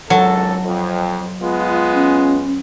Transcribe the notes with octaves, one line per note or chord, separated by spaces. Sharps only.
G#1 C#2 F#3 A4
F2
G#3 B3 F4
C#4